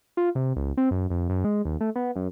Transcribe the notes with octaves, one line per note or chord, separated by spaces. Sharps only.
F4
C3
C#2
C4
F#2
F2
F#2
G#3
D#2
A3
B3
F#2